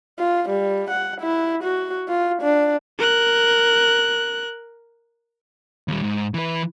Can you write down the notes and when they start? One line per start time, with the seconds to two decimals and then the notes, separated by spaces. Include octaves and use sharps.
0.19 F4
0.49 G3
0.90 F#5
1.21 E4
1.63 F#4
2.08 F4
2.42 D4
2.98 A#4 F#6
5.88 D#2 G3
6.03 G#2
6.34 E3 B4